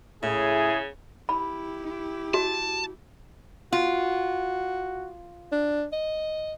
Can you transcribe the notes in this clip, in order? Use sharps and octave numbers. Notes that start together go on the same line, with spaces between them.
A2 C#3 E4 G#4
E4 G4 B5
F#4 A5
F4 F#4
D4
D#5